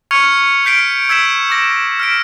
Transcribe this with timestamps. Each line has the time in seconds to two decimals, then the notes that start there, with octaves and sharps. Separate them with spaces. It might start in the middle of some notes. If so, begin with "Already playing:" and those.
0.11 C#6 F6 G#6 C#7 F7
0.65 F6 G6 B6 C7 D7
1.09 E6 G#6 B6 E7
1.50 D6 A#6
2.00 F6 B6 D7